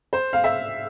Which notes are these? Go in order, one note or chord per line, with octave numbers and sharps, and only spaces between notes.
C5
F5
E5